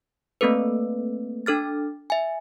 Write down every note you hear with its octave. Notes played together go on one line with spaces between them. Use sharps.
A3 A#3 C4 A4 B4
D4 A4 F6 A6
E5 G#5